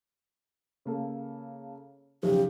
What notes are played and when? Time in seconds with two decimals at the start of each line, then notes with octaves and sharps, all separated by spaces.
0.85 C#3 A#3 A4
2.23 B1 F2 C#3 G4